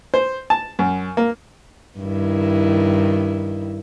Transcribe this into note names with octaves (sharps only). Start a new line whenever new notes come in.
C5
A5
F#2
A#3
G2 D#3 E4